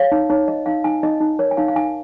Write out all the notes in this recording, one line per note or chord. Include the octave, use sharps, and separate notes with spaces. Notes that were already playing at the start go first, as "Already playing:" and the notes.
Already playing: C#5 F5
D#4
D#4 C#5
C#5 D#5
D#4 F5
D#4 G#5
D#4 D#5
D#4 D#5
A#4 C#5
G#5
D#4 F5
F5
D#4 G#5